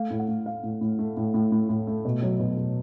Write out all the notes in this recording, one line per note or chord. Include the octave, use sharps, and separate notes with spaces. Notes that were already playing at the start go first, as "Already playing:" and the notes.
Already playing: A3 F5
A2
F#5
A2
A3 F5
A2
A2
A3
A2
A2
A2
A2
A3
B2
F#3
B2
B2